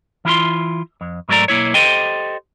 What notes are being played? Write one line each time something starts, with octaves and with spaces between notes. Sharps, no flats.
E3 E4 F4 C6
F2
G#2 F#3 A3 A#4 D5 A#5
B1 A#3 E4 C#5
G4 A4 C5 D#5 G5